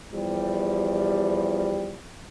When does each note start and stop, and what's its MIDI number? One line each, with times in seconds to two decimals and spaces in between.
0.12 1.99 40
0.12 1.99 53
0.12 1.99 55